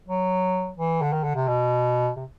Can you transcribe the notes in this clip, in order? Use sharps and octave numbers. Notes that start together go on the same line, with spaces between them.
F#3
E3
D3
D#3
D3
C3
B2
C3